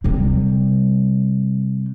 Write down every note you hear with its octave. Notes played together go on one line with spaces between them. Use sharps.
C3 G3